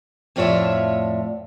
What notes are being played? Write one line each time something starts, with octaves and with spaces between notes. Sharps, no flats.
F2 A2 F4 C#5 D5 E5